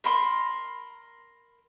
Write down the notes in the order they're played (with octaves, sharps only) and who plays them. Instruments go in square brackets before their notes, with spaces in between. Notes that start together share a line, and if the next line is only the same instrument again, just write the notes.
[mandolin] A#4 B5 C6